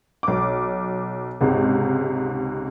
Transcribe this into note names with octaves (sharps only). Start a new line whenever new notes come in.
B1 D6
C#2 G#2 C3